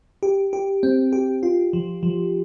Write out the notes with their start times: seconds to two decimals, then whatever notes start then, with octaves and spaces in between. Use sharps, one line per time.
0.23 G4
0.53 G4
0.83 C4
1.13 G4
1.43 F4
1.73 F3
2.03 F3